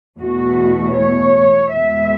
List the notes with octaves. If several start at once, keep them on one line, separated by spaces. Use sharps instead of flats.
E2 B2 A3 F#4
C#5
E2 B2 G#3 B3 E5